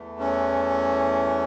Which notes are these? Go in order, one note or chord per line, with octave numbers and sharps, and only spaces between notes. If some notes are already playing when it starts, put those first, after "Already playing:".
Already playing: E2 E3 A3
C#4